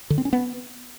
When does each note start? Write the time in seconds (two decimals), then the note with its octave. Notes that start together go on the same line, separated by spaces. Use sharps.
0.10 D3
0.18 C4
0.25 C#4
0.33 B3